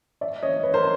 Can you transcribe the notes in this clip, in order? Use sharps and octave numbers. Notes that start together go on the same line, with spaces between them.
D5 E5
C#5 D#5
B4 C#5
A#4 C5